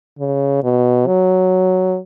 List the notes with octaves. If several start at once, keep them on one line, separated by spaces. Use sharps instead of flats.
C#3
B2
F#3